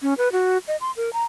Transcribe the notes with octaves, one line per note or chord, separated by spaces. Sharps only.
C#4
B4
F#4
D#5
C6
A#4
A#5